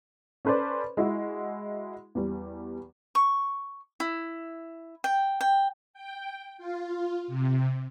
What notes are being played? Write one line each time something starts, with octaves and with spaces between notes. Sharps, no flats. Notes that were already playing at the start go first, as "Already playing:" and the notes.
C#4 A4 B4 C5 D5
G#3 E4 F#4
E2 G3
C#6
E4
G5
G5
G5
F4
C3